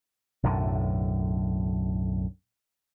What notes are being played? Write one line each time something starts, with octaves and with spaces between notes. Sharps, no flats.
B1 F#2 A2 D3